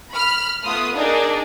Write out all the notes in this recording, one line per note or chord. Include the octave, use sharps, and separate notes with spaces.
B5 F6
A3 B3 F4 B4 D#6
D4 D#4 G#4 A#4 D5